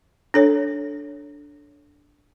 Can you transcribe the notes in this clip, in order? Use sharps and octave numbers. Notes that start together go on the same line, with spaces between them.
D4 A4 C#5